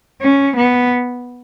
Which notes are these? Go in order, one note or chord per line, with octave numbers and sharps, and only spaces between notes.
C#4
B3